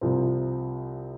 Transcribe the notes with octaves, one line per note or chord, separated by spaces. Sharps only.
C2 C3 F3 C4